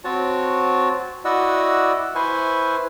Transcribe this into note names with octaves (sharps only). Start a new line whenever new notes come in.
C4 F#4 C#5 A5
E4 F#4 D5 D#5 F#5 E6
E4 B4 C5 G#5 C#6